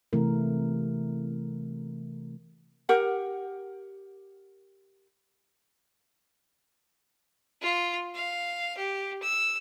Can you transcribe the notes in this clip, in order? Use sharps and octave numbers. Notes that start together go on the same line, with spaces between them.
C3 E3 A3 A#4
G4 A#4 F#5
F4
F5
G4
E6